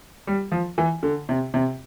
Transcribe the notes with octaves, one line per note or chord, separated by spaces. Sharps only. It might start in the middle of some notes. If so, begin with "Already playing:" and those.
G3
F3
E3
D3
C3
C3